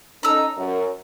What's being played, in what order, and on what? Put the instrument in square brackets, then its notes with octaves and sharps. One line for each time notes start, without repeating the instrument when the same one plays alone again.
[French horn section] C#4 D#4 A4 [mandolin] A#5 E6
[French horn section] F#2